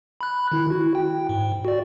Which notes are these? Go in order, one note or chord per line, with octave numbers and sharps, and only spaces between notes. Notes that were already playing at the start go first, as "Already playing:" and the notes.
B5 F#6
D#3 E4
E4 F#4
G5
G#2
F#4 D5